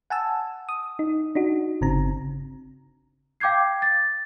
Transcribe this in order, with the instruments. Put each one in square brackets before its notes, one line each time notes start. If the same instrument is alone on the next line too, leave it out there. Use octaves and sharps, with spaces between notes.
[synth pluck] F#5 G#5 A5 E6
D#6
D#4
D4 D#4 F#4
G1 C#3 C4 A#5
[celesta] F5 G5 D6 G6 G#6 C7
A6